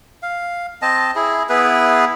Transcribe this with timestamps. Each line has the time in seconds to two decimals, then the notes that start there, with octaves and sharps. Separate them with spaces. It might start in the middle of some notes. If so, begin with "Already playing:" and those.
0.22 F5
0.82 C4 D#5 A5
1.15 E4 G#4
1.49 B3 E4 G#4 B4